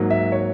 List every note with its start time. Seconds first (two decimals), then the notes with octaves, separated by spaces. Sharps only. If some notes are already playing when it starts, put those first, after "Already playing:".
Already playing: G#2 F#3 A#3
0.10 E5
0.32 C#5